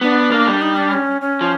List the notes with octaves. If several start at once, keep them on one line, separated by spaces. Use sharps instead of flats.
B3 D4
A#3
G3
D#4
D4
C#4
C#4
F3